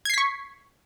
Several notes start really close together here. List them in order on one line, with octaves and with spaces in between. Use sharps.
G#6 C7 B6 C#6